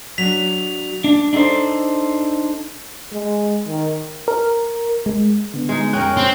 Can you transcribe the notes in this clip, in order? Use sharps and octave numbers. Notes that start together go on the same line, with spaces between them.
F#3 D4 B6 F7
D4
D4 D#4 F#4 A4 C5
G#3
D#3
A#4
G#3
D3 B3
G#3 D#4
F2 C#4 A#4 G5 F#6
C4